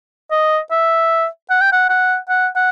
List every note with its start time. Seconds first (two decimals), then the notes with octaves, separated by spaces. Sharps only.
0.31 D#5
0.71 E5
1.50 F#5
1.61 G5
1.72 F#5
1.89 F#5
2.29 F#5
2.55 F#5